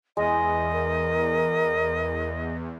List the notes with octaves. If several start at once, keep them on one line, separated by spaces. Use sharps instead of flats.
E2 G#3 D#5
A#4